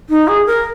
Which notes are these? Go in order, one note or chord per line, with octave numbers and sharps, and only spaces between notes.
D#4
G#4
A#4